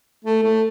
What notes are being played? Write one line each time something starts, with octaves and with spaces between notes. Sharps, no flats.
A3
A3